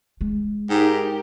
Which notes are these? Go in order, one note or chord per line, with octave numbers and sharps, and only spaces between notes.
G#3
G#2 D#4 G4 A#4